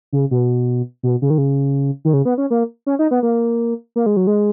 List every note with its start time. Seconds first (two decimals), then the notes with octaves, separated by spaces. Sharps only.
0.13 C#3
0.31 B2
1.03 B2
1.22 C#3
1.30 D#3
1.38 C#3
2.05 D#3
2.13 C#3
2.25 B3
2.38 C#4
2.50 A#3
2.87 C#4
2.99 D#4
3.11 B3
3.23 A#3
3.96 A#3
4.06 G#3
4.17 F#3
4.27 G#3